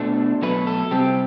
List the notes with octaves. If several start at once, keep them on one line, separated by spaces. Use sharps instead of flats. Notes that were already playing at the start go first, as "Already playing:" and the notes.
Already playing: B2 A3 D4 C5
B2 F#3 A3 B4
A4
C3 G3 C4 G4